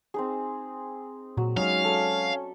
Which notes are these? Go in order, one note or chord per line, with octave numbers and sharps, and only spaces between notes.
C4 D#4 G#4
A#2 F#3
F#3 G#3 C#4 D#4 E5 F5
A4 D5